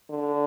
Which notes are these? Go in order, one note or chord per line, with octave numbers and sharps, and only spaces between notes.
D3